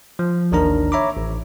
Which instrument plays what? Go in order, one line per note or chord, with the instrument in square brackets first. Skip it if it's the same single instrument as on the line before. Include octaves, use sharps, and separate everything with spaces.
[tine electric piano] F3
A1 D#2 D#3 D4 A#4 A#5
C#5 E5 A#5 B5 D6
A1